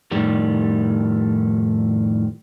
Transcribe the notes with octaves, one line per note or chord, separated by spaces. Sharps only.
F2 A2 D#3 G3